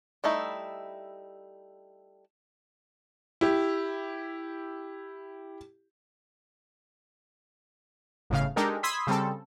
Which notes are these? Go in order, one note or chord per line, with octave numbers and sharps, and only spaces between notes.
G3 A3 D#4 E4
E4 G4
G1 A2 C#3 F5
G#3 D4 D#4 G4 A4 A#4
B5 C6 D#6 E6 G#6 B6
C#3 G3 C4 A4